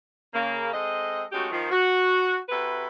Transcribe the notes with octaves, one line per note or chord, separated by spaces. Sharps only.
C#3 A#3
G#3 C4 A4 D#5
G#3 A3 C#4 D#4 F#4 G4
D#3 F3
F#4
C3 E4 F#4 A4 B4